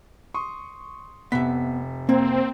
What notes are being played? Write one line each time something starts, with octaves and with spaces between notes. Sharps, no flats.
C6 C#6 D#6
F1 B3 E5 B6
A#3 C4